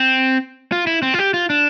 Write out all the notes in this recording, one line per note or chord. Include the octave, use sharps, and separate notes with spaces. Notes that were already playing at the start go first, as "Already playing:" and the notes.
Already playing: C4
F4
E4
C4
F4
G4
F4
D4